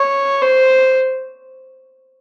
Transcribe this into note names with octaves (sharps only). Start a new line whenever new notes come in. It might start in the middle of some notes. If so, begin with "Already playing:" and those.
Already playing: C#5
C5